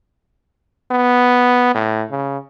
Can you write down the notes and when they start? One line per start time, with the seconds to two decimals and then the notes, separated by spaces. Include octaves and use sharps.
0.92 B3
1.74 A2
2.11 C#3